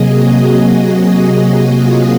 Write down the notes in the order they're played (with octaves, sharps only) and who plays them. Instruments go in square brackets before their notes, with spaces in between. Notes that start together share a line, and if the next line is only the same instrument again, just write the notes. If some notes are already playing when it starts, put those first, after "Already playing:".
Already playing: [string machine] C3 F#3 A#3 G#4 D#5
F#4
F4